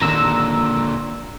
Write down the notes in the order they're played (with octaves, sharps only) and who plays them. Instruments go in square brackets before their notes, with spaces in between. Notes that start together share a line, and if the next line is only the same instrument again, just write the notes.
[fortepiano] D#2 [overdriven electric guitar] A#2 D3 [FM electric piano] A#5 E6